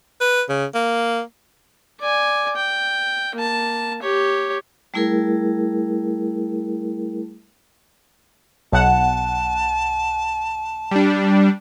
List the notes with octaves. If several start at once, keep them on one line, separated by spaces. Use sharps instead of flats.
B4
C#3
A#3
D5 G#5
G5
A#3 A5
G4 C#5
G3 A3 E4 G#4 A#4
B1 F#5 A5
G3 D4